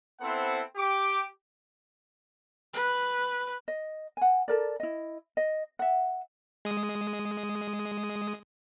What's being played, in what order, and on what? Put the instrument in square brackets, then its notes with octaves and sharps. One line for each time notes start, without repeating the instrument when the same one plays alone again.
[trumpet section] B3 C4 E4 A4 C5 F#5
G4 D6
[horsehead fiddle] B4
[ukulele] D#5
F#5 G#5
A4 A#4 D5
E4 D#5
D#5
E5 F#5
[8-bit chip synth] G#3 D#6